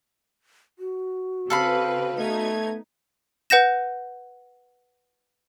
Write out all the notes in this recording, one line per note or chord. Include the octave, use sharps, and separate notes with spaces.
F#4
C#3 C4 A4 B4 F5 B5
A3 B3 D#4 G#6
B4 F#5 G6 A#6 E7